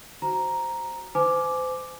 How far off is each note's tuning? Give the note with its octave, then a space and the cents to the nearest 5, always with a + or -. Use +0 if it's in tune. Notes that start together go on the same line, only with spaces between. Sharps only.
F#4 +10 C5 +0 A#5 +0
C5 -40 G#5 +30 D6 +0